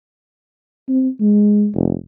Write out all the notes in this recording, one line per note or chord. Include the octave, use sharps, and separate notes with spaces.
C4
G#3
F1